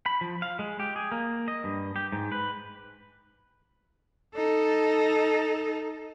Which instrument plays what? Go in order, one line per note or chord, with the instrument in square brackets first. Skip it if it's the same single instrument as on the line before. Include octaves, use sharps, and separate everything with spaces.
[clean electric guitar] B5
F3
F5
G#3
G4
G#4
A#3
D#5
G2
G4
G#2
B4
[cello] D#4 A4